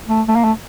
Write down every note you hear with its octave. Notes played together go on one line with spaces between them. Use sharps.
A3
A3
A#3
A3